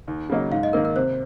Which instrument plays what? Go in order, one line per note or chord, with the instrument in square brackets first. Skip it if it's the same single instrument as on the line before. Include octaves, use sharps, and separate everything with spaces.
[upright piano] D#2
C#3 F#3 A#3 D#4
[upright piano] G#2 [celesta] F5
[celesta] D#5
[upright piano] D#3 A#3 [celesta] A#4
[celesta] A#4
[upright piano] C3 [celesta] C5